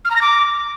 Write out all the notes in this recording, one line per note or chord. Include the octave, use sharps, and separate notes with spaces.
F6
A#5
A#6
D6